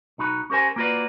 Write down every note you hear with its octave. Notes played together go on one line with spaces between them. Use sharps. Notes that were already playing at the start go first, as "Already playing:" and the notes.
B1 D#4 F#4 B5
C#4 G4 A#4 C5 G#5
A#3 B3 F4 F#4 B4 D5